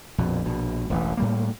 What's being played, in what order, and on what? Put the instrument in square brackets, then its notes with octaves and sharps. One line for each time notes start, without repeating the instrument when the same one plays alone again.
[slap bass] A#1 F2 B2
A#1 B2
E1 A1 E3
A2 G3 A#3